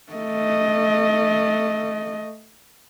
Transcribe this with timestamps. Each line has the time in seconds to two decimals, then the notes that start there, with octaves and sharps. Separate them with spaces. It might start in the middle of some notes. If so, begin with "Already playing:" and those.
0.12 A3 D#5